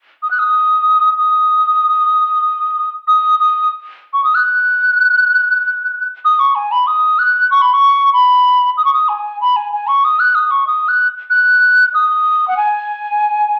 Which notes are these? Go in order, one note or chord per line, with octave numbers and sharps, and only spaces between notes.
D#6
F#6
D#6
D#6
D#6
D#6
C#6
D#6
F#6
D#6
C#6
G#5
B5
D#6
F#6
C#6
B5
C#6
B5
D#6
C#6
D#6
G#5
B5
G#5
G#5
C#6
D#6
F#6
D#6
C#6
D#6
F#6
F#6
D#6
F#5
G#5